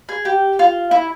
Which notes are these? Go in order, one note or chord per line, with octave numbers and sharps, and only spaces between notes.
G#4
G4
F4
E4